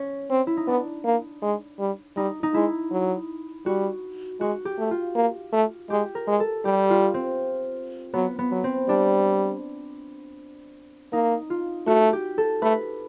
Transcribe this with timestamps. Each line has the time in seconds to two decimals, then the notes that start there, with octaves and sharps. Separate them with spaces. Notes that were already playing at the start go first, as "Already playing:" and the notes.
Already playing: C#4
0.30 C4
0.47 E4
0.57 D#4
0.67 B3 D4
1.05 A#3
1.42 G#3
1.79 G3
2.17 G3 D#4
2.43 D#4
2.54 G#3 E4
2.92 F#3
3.66 G3 F#4
4.41 G#3 F#4
4.65 G4
4.78 A3
4.91 F4
5.15 A#3
5.53 A3
5.90 G#3 G4
6.15 A#4
6.27 G#3
6.40 A4
6.65 G3 G4
6.90 F4
7.14 C4
8.13 F#3 B3
8.39 B3
8.52 F#3
8.64 C4
8.88 G3 D4
11.13 A#3 D#4
11.50 F4
11.87 A3 F#4
12.13 G4
12.38 A4
12.62 A3 B4